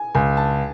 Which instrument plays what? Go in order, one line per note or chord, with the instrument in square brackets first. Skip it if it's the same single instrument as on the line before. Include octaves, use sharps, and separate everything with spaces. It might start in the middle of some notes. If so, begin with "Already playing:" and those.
Already playing: [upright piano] G#5
[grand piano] C#2 [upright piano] G#5
[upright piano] A5